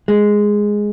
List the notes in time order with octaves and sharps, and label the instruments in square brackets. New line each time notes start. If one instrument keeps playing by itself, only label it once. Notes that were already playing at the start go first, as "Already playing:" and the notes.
[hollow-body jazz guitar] G#3